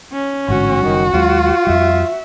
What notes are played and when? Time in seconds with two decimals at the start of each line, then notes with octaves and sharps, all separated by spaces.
0.12 C#4
0.48 A1 G#2 D3 F#4
0.81 F#1 D#3 G3
1.13 D#2 F#3 G#3 F4
1.67 F2 G3 E5